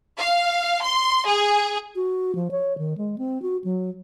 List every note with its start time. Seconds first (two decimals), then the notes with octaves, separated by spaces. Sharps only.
0.18 F5
0.83 C6
1.28 G#4
1.96 F#4
2.35 F3
2.51 C#5
2.78 D#3
2.97 G#3
3.18 C4
3.42 F#4
3.64 F#3